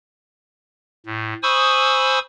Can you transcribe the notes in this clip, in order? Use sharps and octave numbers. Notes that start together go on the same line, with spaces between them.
A2
C5 G#5 B5 C#6 D#6 E6